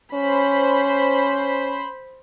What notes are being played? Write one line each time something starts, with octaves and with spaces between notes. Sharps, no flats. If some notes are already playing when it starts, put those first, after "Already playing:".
C#4 C5 B5